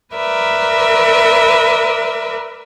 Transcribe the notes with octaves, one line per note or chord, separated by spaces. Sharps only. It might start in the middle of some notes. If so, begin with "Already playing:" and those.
A#4 B4 D5 E5